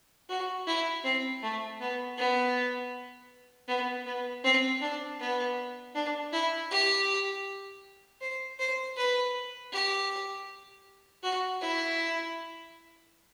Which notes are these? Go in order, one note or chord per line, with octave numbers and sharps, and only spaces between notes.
F#4
E4
C4
A3
B3
B3
B3
B3
C4
D4
B3
D4
E4
G4
C5
C5
B4
G4
F#4
E4